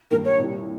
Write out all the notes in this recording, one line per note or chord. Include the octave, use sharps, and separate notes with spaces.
G2 D#3 A#3 A#4
C#5
C2 A#2 G3